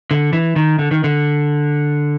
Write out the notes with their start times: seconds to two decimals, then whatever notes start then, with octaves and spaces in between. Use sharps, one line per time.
0.11 D3
0.33 E3
0.56 D#3
0.79 D3
0.91 D#3
1.04 D3